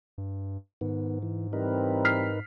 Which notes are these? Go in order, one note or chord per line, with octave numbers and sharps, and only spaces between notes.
G2
G#2 D#3 B3
E3
E3 G3 C4 D#4 A#4 B4
F6 B6 C7